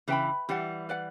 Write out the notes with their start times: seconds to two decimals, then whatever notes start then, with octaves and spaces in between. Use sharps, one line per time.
0.08 C#3 E3 B4 E5 G5 B5
0.49 E3 G3 G4 D5 F#5
0.89 B4 D5 F#5